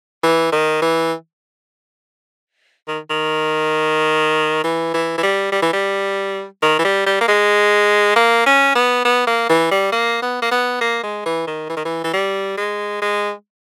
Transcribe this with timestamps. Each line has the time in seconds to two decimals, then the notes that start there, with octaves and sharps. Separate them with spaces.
0.23 E3
0.52 D#3
0.82 E3
2.88 D#3
3.10 D#3
4.64 E3
4.94 E3
5.18 E3
5.23 G3
5.52 G3
5.62 E3
5.73 G3
6.62 D#3
6.79 E3
6.85 G3
7.06 G3
7.21 A#3
7.28 G#3
8.16 A#3
8.46 C#4
8.75 B3
9.05 B3
9.27 A#3
9.49 E3
9.71 G3
9.92 A#3
10.22 B3
10.42 A#3
10.51 B3
10.81 A#3
11.03 G#3
11.26 E3
11.47 D#3
11.69 E3
11.77 D#3
11.85 E3
12.04 E3
12.14 G3
12.57 G#3
13.02 G#3